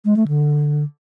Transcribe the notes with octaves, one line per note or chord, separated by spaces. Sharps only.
G#3
A3
D3